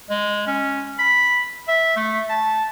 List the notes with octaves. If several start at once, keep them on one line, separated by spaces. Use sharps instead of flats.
G#3
C#4
B5
E5
A3
A5